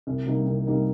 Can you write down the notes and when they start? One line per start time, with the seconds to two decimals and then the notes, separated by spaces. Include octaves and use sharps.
0.07 C2
0.26 C3 G3 A#3 D#4
0.47 C2
0.67 C3 G3 A#3 D#4